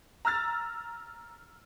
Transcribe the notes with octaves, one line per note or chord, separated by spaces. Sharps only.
A#5 E6 F6 A6